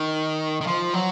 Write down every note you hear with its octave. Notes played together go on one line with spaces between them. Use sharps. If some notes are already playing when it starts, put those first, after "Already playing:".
Already playing: D#3
D#3
F3
F#3